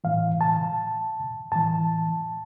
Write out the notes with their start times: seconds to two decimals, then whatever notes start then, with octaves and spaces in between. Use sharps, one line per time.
0.04 A2 E3 F5
0.41 A5
1.52 A2 E3 A5